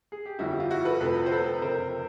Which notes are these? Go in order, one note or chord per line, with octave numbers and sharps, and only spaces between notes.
G#4
G4
G1 F2 D3 G3 E4 F#4
F4
E4 F#4
A4 B4
F1 F2 C3 F3 A3 A4 B4
C5
A4 B4
F#1 F2 C3 A#4 C5